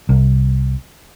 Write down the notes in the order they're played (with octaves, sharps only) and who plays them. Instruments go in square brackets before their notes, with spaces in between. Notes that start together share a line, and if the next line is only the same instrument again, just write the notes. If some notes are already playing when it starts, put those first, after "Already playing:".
[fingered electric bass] C2